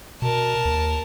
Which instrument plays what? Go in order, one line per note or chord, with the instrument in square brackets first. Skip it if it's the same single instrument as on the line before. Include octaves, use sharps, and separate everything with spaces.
[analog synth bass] B2 [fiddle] A#4 A5
[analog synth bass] D#2